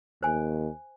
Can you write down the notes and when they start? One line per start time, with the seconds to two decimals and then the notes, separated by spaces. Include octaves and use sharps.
0.23 D#2 C5 G#5